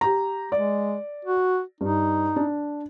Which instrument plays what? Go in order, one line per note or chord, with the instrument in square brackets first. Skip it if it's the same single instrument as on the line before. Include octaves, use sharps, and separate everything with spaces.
[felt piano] G4 A#5
[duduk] G#3 [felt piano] D5
[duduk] F#4
[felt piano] G2 [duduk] D#4
[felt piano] D4